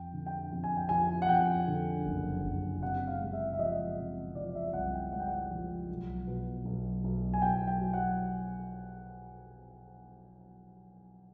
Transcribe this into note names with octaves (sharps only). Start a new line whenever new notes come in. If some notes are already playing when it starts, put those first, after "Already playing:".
Already playing: F2 G5
D3
G5
F2
G#5
G5
F3 G#5
F#5
F2 G5
D3
F#1
F#1
C3 F#5
F5
G#3
E5
E5
F3 D#5
C3
F3 D5
E5
C2 F#5
G5
G#3 F#5
G5
F#5
F3
B1
B2
B1
B1
G#5
B1 G5
G5
F#3
F#5